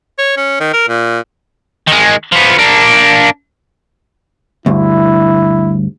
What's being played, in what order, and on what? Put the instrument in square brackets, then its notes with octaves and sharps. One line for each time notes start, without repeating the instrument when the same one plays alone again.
[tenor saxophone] C#5
C#4
D#3
A#4
A#2
[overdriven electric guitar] D#3 G#3
F3 B3
A#3 D4
[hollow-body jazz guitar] D2 G2 [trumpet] E4